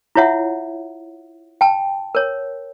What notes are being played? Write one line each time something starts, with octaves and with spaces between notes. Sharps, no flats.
E4 F4 C#5 E5 F#5
G5 A5
A#4 C#5